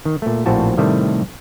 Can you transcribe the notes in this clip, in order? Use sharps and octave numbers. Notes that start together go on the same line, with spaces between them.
D#3
A#2 A3
A#1 A2 C4 F4 F#4 A5
A2 C3 D#3 G3 A3